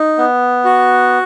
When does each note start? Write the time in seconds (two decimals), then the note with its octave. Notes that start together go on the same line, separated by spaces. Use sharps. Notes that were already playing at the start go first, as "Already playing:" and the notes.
Already playing: D#4
0.18 B3
0.65 F#4